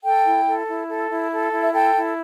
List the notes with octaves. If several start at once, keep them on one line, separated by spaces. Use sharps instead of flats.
A4 G5
E4
A4
E4
A4
E4
A4
E4
E5
A4 G5
E4